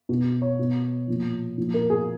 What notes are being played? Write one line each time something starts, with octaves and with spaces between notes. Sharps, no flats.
B2
C#5
B2
A#2 F3
A#2 F3
A#4
G#4